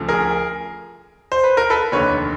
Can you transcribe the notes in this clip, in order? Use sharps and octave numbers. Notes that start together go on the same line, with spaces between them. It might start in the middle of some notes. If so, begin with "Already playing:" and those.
Already playing: D2 C#3 F3 A3
G#4 A#4
C5
B4
A#4
A4 B4
F1 D#2 D3 B4 C#5